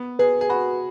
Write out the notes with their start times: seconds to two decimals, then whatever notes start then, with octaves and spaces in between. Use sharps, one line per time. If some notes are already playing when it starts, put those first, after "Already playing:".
Already playing: B3
0.19 G#4 B4
0.41 G#4
0.49 F#4 B5